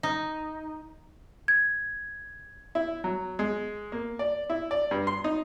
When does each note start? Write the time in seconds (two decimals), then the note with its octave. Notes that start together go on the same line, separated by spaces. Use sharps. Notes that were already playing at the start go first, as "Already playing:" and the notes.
0.03 D#4
1.48 G#6
2.75 E4
3.04 F#3
3.39 G#3
3.92 A#3
4.19 D5
4.50 E4
4.71 D5
4.91 G2
5.07 C6
5.24 D#4